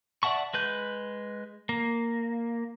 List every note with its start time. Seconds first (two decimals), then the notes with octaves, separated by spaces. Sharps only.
0.23 D5 E5 F#5 A5 C#6
0.54 G#3 B4 G6
1.69 A#3